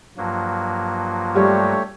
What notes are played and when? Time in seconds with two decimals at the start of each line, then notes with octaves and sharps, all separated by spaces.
0.18 G2 F3 F#3 A#3
1.36 G3 A3 G4 C#5